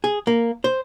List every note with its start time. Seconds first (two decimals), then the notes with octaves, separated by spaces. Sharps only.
0.04 G#4
0.27 A#3
0.64 C5